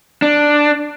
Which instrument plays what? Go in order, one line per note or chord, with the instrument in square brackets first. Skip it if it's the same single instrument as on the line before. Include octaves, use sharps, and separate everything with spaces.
[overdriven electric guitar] D4